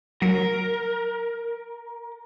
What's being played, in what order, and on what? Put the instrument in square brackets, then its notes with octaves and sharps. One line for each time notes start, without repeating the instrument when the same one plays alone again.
[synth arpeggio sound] F#3 [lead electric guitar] A#4